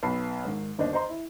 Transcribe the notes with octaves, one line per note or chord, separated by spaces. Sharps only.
B1 B3 B5 C7
G#2 D#3
G1 D#2 D4 C5 D#5
C5 D#5 A#5 C6
E4